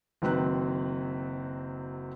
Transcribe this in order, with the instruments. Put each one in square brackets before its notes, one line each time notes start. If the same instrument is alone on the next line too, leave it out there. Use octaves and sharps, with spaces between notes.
[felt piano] F#1 D#3 F#3 C4 B4 F#6